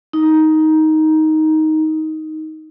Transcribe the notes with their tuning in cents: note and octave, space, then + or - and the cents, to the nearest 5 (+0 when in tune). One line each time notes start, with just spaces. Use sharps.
D#4 +10